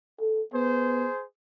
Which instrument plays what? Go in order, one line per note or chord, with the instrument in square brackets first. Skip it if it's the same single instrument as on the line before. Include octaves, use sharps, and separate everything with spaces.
[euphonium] A4
[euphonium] B3 [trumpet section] G#4 C5